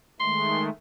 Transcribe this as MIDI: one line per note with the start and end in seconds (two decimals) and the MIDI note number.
0.20 0.69 51
0.20 0.69 56
0.20 0.69 57
0.20 0.63 84